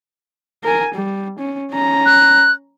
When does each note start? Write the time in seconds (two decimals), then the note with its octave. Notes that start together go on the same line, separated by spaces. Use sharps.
0.64 A#4 G#5
0.95 G3
1.39 C#4
1.72 C#4 A#5
2.06 F#6